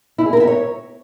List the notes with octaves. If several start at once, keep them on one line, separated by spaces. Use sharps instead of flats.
E4
G#4
A#4
E5
C#5